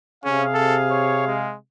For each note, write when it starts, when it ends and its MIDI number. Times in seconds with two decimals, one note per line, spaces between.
0.24 1.53 48
0.24 0.44 61
0.24 1.53 68
0.24 1.53 77
0.54 0.77 69
0.91 1.25 73
1.26 1.55 56